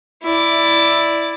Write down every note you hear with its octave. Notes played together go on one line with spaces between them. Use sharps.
E4 D5